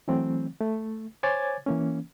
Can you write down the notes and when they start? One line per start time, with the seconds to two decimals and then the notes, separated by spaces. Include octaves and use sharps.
0.08 E3 F#3 A3 C4
0.61 A3
1.23 C5 C#5 G#5 D6 G#6 A6
1.66 E3 A#3 C#4